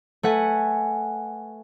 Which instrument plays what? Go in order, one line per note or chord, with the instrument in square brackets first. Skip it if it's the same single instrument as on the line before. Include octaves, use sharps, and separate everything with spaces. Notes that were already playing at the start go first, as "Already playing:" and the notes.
[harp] A3 B4 F#5 G#5